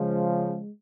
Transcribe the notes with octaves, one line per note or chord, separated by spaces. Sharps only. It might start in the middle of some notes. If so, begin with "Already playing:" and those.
Already playing: C#3 F3 G#3